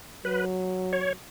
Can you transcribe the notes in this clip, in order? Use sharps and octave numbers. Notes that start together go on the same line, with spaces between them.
F#3 B4
C#5